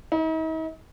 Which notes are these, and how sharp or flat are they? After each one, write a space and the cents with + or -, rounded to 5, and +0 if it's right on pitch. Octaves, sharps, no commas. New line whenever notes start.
D#4 +45